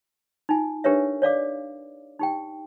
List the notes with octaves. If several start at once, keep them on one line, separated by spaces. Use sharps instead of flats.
D#4 F4 G#5
D4 G4 A#4 B4 C#5 E5
C#5 D5 F5 D6
D#4 G4 G5